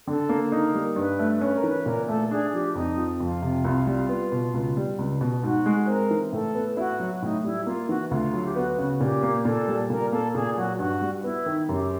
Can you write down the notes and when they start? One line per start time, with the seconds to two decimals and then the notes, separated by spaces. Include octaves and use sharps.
0.07 D3 A4
0.29 A#3
0.52 D#4 A#4
0.74 G3
0.96 G2 B4
1.19 A3
1.41 C#4 B4
1.54 A#4
1.64 E3
1.69 B4
1.86 A#2 A#4
2.08 A3 A4
2.30 D4 G#4
2.53 F3 G4
2.75 F2 D#4
2.98 F3
3.20 F2 F4
3.42 C3
3.64 C2
3.87 G3
4.09 B3
4.32 B2
4.54 C#2
4.77 G3
4.99 C#2
5.21 B2
5.43 G#2 F#4
5.66 G#3
5.84 B4
5.87 C4 A#4
6.11 E3
6.32 A2 A4
6.55 B3
6.77 E4 F#4
7.00 F#3
7.22 A2 D#4
7.44 G3 E4
7.66 A#3 F4
7.89 E3 F#4
8.11 D2 F4
8.34 F#3
8.44 G4
8.56 B3 F#4
8.78 C#3
9.01 A#2 G4
9.23 A#3
9.45 A#2 A4
9.68 G3
9.90 A#2 A#4
10.12 A#3 A4
10.34 A#2 G#4
10.57 F#3 F#4
10.79 G2 F#4
11.01 G3
11.20 F4
11.24 B3 E4
11.46 D#3
11.69 F#2 G4